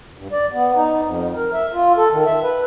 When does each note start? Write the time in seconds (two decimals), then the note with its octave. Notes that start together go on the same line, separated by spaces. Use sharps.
0.18 G2
0.32 D5
0.53 B3
0.76 D#4
1.04 F2
1.36 A#4
1.53 E5
1.74 F4
1.97 A4
2.11 D#3
2.26 E5
2.42 B4